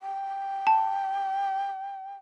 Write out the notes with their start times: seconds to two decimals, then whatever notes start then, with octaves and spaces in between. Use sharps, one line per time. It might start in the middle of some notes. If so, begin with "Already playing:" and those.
0.01 G5
0.67 A5